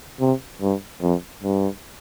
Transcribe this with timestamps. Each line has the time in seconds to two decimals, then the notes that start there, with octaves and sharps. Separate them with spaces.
0.20 C3
0.62 G2
1.02 F2
1.43 G2